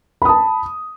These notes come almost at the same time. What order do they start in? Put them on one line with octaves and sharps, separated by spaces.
B5 D#6 A5